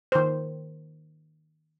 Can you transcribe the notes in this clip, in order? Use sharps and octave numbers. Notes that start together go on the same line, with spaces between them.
D#3 C5